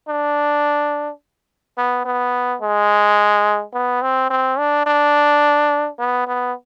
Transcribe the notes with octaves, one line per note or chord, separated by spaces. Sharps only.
D4
B3
B3
G#3
B3
C4
C4
D4
D4
B3
B3